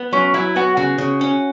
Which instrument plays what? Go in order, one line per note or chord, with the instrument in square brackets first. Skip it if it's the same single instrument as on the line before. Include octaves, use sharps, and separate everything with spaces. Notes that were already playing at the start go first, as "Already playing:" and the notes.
Already playing: [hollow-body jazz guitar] B3
[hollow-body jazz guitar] F#3 [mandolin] C#4
[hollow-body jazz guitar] F#3 [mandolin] E4
[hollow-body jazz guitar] B3 [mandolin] F#4
[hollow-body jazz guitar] C#3 [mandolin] F#4
[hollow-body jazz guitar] C#3
C#4